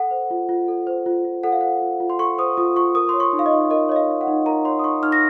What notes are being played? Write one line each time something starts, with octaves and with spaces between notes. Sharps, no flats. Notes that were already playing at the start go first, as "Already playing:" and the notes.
Already playing: A4 F#5
C5
F4
F4
A4
C5
F4
F4
A4 F#5
F5
C5 F#5
F4
F4
C6
A4 C#6
C5 D#6
F4 D#6
F4 C#6
A#4 D#6
C#5 C6
C#6
D#4
F5
D#5
D#4
A#4 D#5
C#5 D#5
F5
D#4
F#5
D#4
A#4 A#5
C#5 C6
D#6
D#4 C#6
D#4 F6
A#6